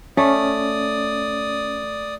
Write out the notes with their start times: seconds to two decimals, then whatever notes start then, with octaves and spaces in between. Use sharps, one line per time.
0.17 A3 C#4 D5 D#6